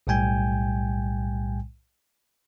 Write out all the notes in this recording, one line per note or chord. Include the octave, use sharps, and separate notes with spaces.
B1 A2 G3 G5 G#5 G6